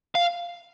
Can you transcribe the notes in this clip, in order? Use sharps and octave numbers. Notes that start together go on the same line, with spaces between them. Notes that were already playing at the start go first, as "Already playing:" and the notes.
F5